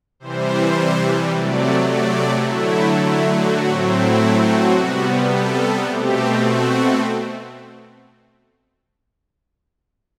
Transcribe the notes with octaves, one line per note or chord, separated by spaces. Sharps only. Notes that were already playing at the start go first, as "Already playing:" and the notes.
C3 E3 G3 C5
C3 F#3 A3 D5
D5
D3 F#3 A3 E4
E4
F#4
A2 F#3 A3 C4
E4
F#4
C3 G3 B3
A4
B2 A3 C4 G4
F#4